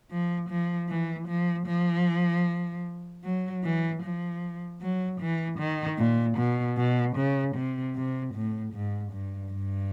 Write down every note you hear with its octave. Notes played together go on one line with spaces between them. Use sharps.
F3
F3
E3
F3
F3
F#3
E3
F3
F#3
E3
D#3
A#2
B2
B2
C#3
C3
C3
A2
G#2
G2
G2